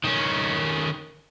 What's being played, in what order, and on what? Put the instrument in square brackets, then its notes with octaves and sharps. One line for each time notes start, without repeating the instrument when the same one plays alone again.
[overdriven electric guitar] D#3 C#4